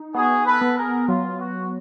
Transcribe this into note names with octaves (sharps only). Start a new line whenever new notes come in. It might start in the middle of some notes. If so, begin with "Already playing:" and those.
Already playing: D#4
B3 F#4 G#4
A4 B4
B3
G#4 A#4
F#3 F4
F#4